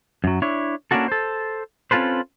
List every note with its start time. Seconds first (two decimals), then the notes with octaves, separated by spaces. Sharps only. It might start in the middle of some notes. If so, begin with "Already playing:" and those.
0.24 F#2 F#3
0.42 D4 E4 C#5
0.91 A#3 C#4 D4 E4 F#4 A4
1.08 A4 C5
1.91 C4 C#4 F4 A4 B4 C5